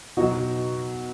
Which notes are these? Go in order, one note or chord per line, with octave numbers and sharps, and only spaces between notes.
B2 F#3 D#4 F#4